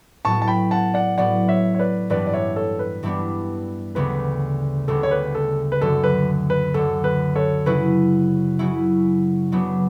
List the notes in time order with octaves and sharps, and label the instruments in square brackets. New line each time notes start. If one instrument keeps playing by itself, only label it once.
[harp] A2 F#3 B3 [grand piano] A5 C#6
[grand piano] A5
G5 B5
F#5 A5
D5 F#5
[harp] A2 F#3 B3 [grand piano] D5 F#5
[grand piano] C#5 E5
C#5
B4 D5
[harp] G2 E3 G3 B3 D4 [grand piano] B4 D5
[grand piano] D5
C#5 E5
A4 C#5
B4
[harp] G2 E3 G3 B3 D4
[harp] D2 C#3 G3 B3 [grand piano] B4
[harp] D2 C#3 G3 B3 [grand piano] A4
[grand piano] C#5
B4
A4
B4
[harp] F#2 D3 F#3 [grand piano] A4
[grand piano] B4
B4
[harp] F#2 D3 F#3 [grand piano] A4
[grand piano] B4
A4 C#5
[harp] C#3 F#3 C#4 E4 [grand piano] B4
[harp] C#3 F#3 C#4 E4
C#3 F#3 B3 D4